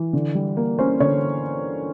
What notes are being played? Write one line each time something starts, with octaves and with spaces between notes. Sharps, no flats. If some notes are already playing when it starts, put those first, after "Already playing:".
Already playing: E3
D3
G3
A#3
C#4 C5
D3 C#5